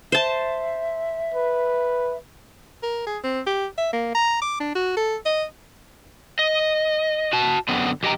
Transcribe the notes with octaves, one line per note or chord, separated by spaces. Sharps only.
C5 E5 A5
B4
A#4
G#4
C4
G4
E5
A#3
A#5
D6
D4
F#4
A4
D#5
D#5
F#4 A5
F#2 D3 B3 C4
F#2 G4 D#5 G5 A#5